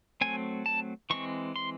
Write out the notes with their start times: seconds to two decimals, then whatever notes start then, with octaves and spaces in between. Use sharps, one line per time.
0.21 F#3 A3 C4 G#5
0.66 A5
1.10 E3 G#3 C4 C#6
1.56 C6